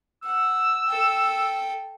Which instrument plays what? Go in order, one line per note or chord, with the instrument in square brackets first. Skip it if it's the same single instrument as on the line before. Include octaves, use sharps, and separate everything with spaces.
[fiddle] F#5 [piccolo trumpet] E6
[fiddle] A4 G5